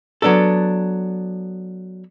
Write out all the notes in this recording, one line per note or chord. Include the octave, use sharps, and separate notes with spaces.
F#3 B3 D4 A4